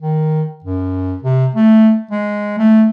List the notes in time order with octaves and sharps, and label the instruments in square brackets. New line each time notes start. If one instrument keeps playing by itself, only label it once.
[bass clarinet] D#3
F#2
C3
A3
G#3
A3